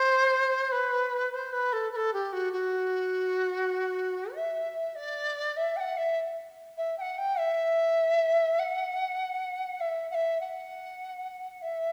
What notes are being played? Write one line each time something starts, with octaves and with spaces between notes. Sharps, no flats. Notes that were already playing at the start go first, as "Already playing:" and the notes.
Already playing: C5
B4
C5
B4
A4
B4
A4
G4
F#4
F#4
E5
D5
E5
G5
F#5
E5
E5
G5
F#5
G5
E5
F#5
E5
F#5
E5
F#5
E5